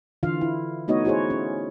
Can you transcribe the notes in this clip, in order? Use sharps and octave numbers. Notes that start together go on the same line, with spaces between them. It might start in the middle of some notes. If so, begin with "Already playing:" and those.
D3 E3 F4 F5
E4
A3 B3 D#4 F#4 C#5 D#5
E4 F#4 G#4 C5 C#5
C#4